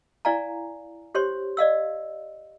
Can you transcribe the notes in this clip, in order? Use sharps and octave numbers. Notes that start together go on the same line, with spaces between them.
E4 D5 F5 G#5 A#5
G4 C5 C#5 C6
D5 D#5 F5 E6